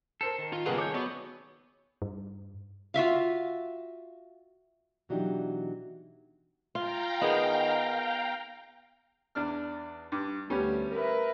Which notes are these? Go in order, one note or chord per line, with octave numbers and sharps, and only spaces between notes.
A4 A#4 C5 C7
D#3
F4
C#3 G3 A#3 B3 F4 G#4 A4 F#5
C#5 D6 G6
F#3 B3
G2
F4 F#4 E5 F5
B2 E3 F#3 D4 D#4 G4
F4 F5 G5 A#5
D#3 B3 G#4
E2 D4 F6
G2
D2 G3 B3 C#4
A#4 B4 E5